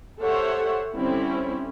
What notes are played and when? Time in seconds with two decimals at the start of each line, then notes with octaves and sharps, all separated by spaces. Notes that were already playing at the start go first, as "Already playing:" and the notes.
0.21 G4 A4 C5 C#5 E5 F#5
0.94 D3 G3 C4 C#4 E4